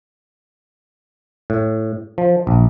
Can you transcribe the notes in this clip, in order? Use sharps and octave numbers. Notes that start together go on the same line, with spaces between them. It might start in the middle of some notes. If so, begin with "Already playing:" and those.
A2
F3
A#1